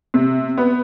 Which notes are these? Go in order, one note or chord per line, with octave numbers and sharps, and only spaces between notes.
C3
B3